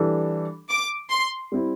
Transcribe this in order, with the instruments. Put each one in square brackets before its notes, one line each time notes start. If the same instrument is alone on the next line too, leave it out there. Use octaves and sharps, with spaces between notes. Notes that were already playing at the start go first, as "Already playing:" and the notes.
Already playing: [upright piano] E3 G3 D4 A4
[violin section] D6
C6
[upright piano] G3 C4 E4